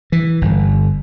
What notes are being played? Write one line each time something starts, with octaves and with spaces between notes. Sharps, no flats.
E3
G1